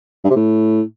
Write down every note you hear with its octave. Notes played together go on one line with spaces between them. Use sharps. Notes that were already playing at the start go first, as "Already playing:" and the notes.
G2
C3
A2